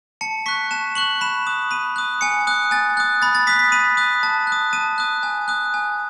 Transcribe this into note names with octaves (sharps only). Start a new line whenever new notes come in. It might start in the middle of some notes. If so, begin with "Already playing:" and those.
A5 C#7
C#6 F#6 B6
A5 E7
C#6 F#6 F#7
B5 E7
D#6 F#6
B5 D#7
D#6 F#6
G#5 C#7
D#6 F#6
G#5 A6
D#6 F#6
B5 A6
A6
D#6 F#6 B6
B6
B5 D#7
D#6 F#6
A5
F#6
D#6
A5 D#7
D#6 F#6
G#5
D#6 F#6
G#5